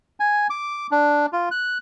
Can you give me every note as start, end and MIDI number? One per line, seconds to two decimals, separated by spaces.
0.20 0.47 80
0.50 0.87 86
0.91 1.26 62
1.33 1.49 65
1.51 1.78 90